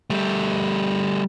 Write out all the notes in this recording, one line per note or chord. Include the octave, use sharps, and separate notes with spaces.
G3 A3